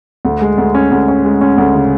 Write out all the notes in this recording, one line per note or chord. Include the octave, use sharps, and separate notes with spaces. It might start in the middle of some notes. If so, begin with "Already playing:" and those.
D2
G#3
D2
C#4
D2
C#4
G#3
C#4
D2
C#3